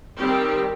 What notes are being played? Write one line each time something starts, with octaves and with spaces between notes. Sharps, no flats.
D#3 G3 C4 G4